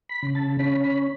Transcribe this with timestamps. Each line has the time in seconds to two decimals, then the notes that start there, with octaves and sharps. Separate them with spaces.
0.09 B5
0.23 C#3
0.35 A5
0.59 C#4 B5
0.84 B5